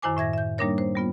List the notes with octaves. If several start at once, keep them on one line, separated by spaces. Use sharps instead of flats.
F#2 D#3 E4 C5 G#5 D6
A2 E5 G#6 A#6
E5 G6
G3 A#3 D4 D#4 A#4 C#5
C5
G3 B3 F4